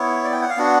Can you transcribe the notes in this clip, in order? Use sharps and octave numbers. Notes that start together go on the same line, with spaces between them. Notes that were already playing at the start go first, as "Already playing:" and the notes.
Already playing: B3 E4 C#5
D5
G5
F#5
F5
B3 D4 F#4 F#5